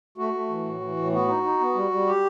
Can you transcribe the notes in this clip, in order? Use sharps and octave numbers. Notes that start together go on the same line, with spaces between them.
A3 F#4
A3
E3
A2
E3
A2
B3 F#4
D#4
D#4
B3
G3
G3
G4